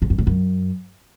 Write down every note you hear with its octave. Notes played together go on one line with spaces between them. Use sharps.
G#2
F#2
G#2
F#2